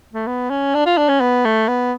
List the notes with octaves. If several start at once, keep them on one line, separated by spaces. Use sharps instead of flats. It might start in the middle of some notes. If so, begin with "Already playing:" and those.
A3
B3
C#4
D4
F4
D4
C#4
B3
A3
B3